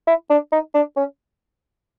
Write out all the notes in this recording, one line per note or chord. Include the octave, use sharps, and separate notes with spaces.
E4
D4
D#4
D4
C#4